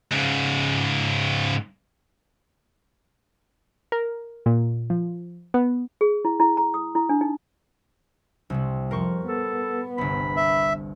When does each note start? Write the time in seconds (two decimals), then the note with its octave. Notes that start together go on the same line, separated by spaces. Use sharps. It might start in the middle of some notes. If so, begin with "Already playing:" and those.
0.11 G#2 C#3
3.92 A#4
4.46 A#2
4.90 F3
5.54 B3
6.01 G#4
6.25 E4
6.40 E4
6.57 A#5
6.74 D#6
6.95 E4
7.09 D4
7.21 D#4
8.50 C2 C3 G3
8.91 F2 A#4 C5 C#6
9.28 B3 A4
9.98 G1 C2 B5
10.37 E5